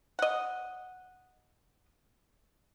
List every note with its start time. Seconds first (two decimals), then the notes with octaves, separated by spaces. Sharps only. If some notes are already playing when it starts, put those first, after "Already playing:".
0.19 D#5 F#5